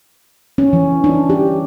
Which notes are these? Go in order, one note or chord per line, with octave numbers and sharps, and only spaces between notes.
C#4
E3
D4
G4